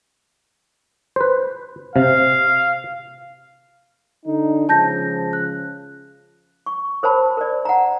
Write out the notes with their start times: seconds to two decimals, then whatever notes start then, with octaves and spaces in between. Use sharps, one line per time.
1.16 B4 C5
1.96 C3 F5
4.26 D3 D#4
4.69 C#2 C#3 F3 A5 G6 A#6
5.33 F#6
6.66 C#6
7.03 A#4 C5 C#5 A5 B5
7.37 A#4 C5 D5
7.65 F#5 A#5